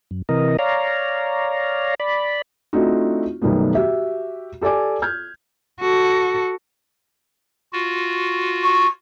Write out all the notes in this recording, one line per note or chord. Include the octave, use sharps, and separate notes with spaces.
F#2
C3 E3 A#4 D#5
C#5 D5 F5 A#5
D5 B5
A3 C4 D4 D#4 F4 F#4
F#2 B2 D#3 G3 A3 B3
F#4 G4 E5
G4 A4 D5 G#5 D6
F6 G6 G#6
F#4 A4
F4 F#4
C#6